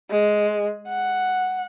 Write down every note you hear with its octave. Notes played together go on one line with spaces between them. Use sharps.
G#3
F#5